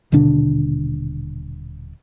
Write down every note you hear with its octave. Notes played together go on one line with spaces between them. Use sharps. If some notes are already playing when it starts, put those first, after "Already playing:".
D#1 B2 D3 D4